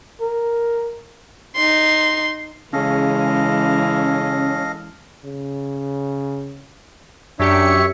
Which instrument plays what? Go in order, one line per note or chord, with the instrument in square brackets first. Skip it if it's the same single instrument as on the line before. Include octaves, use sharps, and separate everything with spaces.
[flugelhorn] A#4
[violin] D#4 C6
[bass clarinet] C#3 [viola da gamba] E3 G#3 [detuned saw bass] C#4 [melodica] A4 D#5 F5
[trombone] C#3
[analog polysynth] F#2 G4 C#7 [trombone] D4 [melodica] C#5 E5